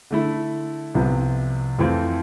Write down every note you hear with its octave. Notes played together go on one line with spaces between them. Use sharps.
D3 A3 E4
C2 C3 F3 B3
F2 E3 A3 C4 F4